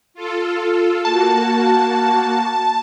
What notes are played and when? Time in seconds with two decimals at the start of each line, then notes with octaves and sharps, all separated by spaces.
0.14 F4 A4
1.05 A#3 F#4 A5